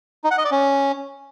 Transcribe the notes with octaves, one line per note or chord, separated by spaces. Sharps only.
D#4
F#5
D#5
D5
C#4